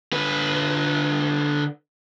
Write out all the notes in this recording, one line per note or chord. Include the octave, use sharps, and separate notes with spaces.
D3 B4